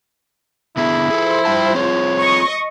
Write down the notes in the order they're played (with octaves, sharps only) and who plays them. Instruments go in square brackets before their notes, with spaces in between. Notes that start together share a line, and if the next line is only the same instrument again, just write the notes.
[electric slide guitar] D3 B3 G#4 [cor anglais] E4
[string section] F3 C5 [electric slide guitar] G#4 A4
[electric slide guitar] G3 G5 A5
[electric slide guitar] C4 F4 G#4 [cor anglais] C#5
[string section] D#5 C#6